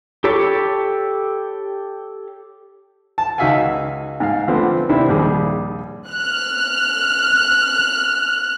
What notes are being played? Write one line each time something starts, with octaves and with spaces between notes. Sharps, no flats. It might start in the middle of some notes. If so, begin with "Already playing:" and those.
G4 A4 C#5 B5 D6
A5
C#2 D#4 F#4 E5 F5 G#5
G#2 F5
D3 F3 A3 B3 C4
C3 D#3 C4 D4 E4
A#1 D#2 G3 G#4
F6 F#6